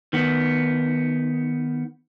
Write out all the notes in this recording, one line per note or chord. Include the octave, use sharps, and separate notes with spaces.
D#3 B3